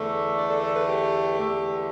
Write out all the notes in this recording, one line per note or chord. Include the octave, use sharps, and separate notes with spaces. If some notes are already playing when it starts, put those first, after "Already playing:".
Already playing: E2 D3 A3
D5
A4
A4
B4
G4
E2 D3 A3